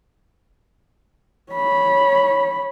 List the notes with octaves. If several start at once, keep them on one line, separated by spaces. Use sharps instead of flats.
C#5 B5